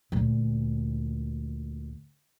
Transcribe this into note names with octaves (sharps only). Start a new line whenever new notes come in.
D2 A#2